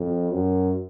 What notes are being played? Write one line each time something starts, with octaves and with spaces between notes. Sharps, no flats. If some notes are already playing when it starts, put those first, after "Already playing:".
Already playing: F2
F#2